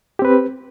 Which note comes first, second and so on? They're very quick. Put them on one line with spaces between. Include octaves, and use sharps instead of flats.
G4 C4 B4